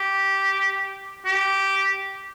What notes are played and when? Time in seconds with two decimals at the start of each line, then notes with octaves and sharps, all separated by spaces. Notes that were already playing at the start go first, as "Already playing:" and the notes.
Already playing: G4
1.25 G4